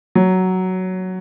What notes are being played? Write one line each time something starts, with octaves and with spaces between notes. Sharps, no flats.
F#3